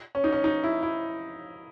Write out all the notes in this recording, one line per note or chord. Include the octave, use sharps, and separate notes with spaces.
C#4
D#4
C#4
D#4
E4
E4